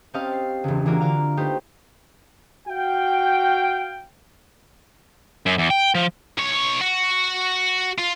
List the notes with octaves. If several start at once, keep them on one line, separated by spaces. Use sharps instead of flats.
C4 C#4 G4 D#5 F5 A5
C7
E1 C#2
E3 A#3 D4 F4 F#4 A#4
D3 A#4 F5 F6
A3 D#4 G4 B4 C5
F#4 F5 G5
F#2
E2
G5
F3
B1 C#5
F#4
F4